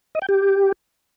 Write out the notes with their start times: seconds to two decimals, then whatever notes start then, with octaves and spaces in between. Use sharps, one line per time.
0.15 D#5
0.22 G5
0.29 G4